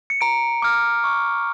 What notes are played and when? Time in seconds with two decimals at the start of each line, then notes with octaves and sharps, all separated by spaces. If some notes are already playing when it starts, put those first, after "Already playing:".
0.10 C#7
0.21 A#5 D7
0.62 D6 F6
1.04 C#6